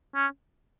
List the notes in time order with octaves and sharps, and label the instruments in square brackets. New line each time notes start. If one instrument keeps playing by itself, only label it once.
[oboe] C#4